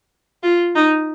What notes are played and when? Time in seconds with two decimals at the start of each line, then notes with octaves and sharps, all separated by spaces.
0.43 F4
0.75 D#4